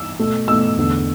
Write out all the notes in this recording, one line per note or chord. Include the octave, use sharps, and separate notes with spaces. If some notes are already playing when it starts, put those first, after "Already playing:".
Already playing: E6
B2 A3
B2 A3 E6
E2 D3 A3